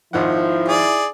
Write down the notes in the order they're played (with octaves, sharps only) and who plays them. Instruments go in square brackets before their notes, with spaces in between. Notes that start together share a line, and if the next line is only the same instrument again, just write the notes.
[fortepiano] G#1 D#3 F#5 [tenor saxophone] F3 [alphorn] E4
[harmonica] G#4 D5